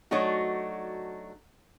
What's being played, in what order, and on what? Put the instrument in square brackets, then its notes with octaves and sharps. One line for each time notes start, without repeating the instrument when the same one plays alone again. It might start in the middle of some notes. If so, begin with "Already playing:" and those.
[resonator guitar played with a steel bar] F#3 A3 D4 D#4 F#4